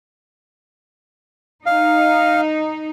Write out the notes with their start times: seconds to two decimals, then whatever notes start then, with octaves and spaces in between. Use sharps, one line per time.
1.66 D#4 F5